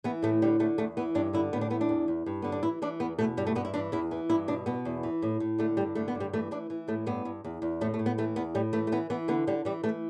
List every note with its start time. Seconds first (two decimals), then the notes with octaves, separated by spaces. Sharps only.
0.04 E3 B3
0.22 A2 A3
0.42 D3 G3
0.59 D3 A3
0.78 E2 A3
0.97 E3 B3
1.15 G2 D4
1.33 D3 E4
1.53 A2 B3
1.61 D4
1.70 E3 B3
1.81 D4
1.89 E2
2.08 E2
2.26 G2
2.42 D3 B3
2.52 D4
2.63 E3 E4
2.82 E3 D4
3.00 E2 B3
3.19 B2 A3
3.37 G2 G3
3.47 A3
3.55 G2 B3
3.65 E4
3.74 E3 D4
3.92 E2 E4
4.11 E3
4.30 G2 E4
4.48 B2 D4
4.66 B2 B3
4.85 E2
5.03 E3
5.22 A2
5.40 A2
5.58 D3 A3
5.77 G2 G3
5.95 D3 A3
6.08 B3
6.15 G2
6.20 G3
6.33 E3 A3
6.51 E3 D4
6.70 E3
6.88 A2 A3
7.06 G2 B3
7.25 G2
7.44 E2
7.62 E2
7.81 A2 A3
7.94 A3
7.99 A2
8.06 B3
8.18 E3 A3
8.36 E2 B3
8.55 A2 G3
8.73 E3 A3
8.87 A3
8.92 E3 B3
9.10 E3 B3
9.28 D3 B3
9.47 D3 G3
9.65 E3 G3
9.83 E3 A3